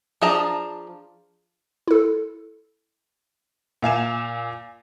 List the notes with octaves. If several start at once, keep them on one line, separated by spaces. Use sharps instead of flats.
F3 D4 G#4 A5 A#5
E4 A4
A#2 F5 G#5 E7